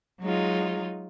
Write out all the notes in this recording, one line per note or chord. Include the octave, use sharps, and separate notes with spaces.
F#3 G#3 D#4 F4